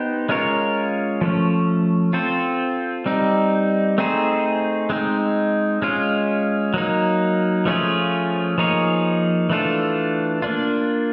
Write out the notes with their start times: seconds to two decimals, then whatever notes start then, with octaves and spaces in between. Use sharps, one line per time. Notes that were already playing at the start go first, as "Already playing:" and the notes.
Already playing: B3 D#4 G4 C5
0.29 G#3 C#4 F4 A#4 C#5
1.21 F3 A3 C#4
2.13 C4 F4 A4 C5
3.06 G3 C4 D#4
3.98 A3 C4 D#4 G#4 C5
4.90 G#3 C4 D#4
5.82 G#3 C#4 F4
6.74 F#3 A#3 D#4
7.65 F3 A3 C#4 F4 G#4
8.58 F3 A#3 D#4 G#4 C#5
9.49 E3 A3 D4 F4 A4
10.42 A#3 D4 F4